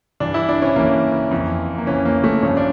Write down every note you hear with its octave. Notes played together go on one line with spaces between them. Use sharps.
G2 E3 D4
E4
D4
C#4
G2 E3 A#3
F2 E3
A#3
F2 E3 C#4
A#3
A3
G2 F3 C#4
D4